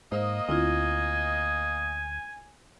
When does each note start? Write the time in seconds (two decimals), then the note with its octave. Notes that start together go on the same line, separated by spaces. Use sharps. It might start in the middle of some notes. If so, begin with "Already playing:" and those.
0.12 G#2 A#3 C5 D#5
0.49 D2 C4 E4 F4 G#5